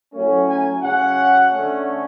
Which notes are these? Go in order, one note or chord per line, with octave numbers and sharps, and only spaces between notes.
A2 F#3 A3 C#4
G#5
C#3 F#3 C#4 F#5
D3 A3 C#4